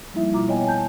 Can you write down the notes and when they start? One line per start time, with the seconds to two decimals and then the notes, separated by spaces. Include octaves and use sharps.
0.13 F3 G3 A#3 D#4 E4 E5
0.33 B2 F4 A#5 D6
0.48 B3 C#5 D#5 G5 G#5
0.66 G#5 A5 G6